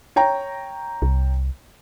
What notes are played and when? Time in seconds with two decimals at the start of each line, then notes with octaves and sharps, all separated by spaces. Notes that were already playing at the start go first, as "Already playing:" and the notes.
0.16 C#5 G5 A#5
1.02 C2